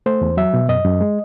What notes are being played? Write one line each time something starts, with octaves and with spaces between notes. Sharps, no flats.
A3 C5
E2
F#3 E5
B2
F#2 D#5
F#2
G#3